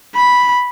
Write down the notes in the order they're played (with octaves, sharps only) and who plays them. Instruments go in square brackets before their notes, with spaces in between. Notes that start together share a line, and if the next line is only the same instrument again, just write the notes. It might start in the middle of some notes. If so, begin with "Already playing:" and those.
[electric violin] B5